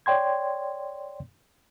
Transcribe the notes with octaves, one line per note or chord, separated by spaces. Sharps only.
C#5 D5 G5 C6 G#6